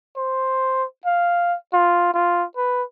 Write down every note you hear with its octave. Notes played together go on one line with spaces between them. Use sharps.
C5
F5
F4
F4
B4